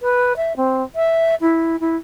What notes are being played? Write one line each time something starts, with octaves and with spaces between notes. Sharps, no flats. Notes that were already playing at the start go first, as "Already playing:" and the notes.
B4
E5
C4
E5
E4
E4